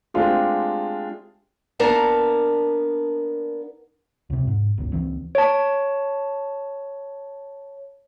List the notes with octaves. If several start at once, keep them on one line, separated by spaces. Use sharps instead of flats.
G#3 A3 C4 D4 F4 G4
A#3 B3 D4 A#4 A5
C#2 C3
G#2
G1 C#2
C#2 E3 C4
C#5 A5